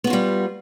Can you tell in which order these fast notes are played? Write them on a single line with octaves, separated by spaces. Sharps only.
B3 F#4 F4 G3